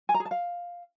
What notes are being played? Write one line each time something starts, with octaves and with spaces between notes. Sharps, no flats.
G#5
A#5
G#4
A5
F5